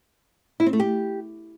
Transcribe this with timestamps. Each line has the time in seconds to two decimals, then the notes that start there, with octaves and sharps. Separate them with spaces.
0.60 E4
0.66 C4
0.73 A3
0.80 G4